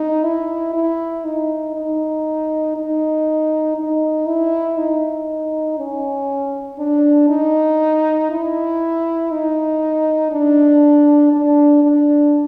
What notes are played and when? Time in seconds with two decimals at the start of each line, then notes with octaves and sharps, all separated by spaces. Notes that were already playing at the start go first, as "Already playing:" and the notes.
Already playing: D#4
0.23 E4
0.74 E4
1.25 D#4
1.75 D#4
2.76 D#4
3.77 D#4
4.26 E4
4.78 D#4
5.78 C#4
6.79 D4
7.29 D#4
8.31 E4
9.31 D#4
10.32 D4
11.33 D4
11.83 D4